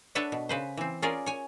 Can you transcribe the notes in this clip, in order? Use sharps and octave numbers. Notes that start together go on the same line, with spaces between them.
D4 A4 B4 C#5 E5 F#5
B2
C#3 B4 C5
E3 C4
C#4 F4 G#4 A#4 D5
C#5 G#5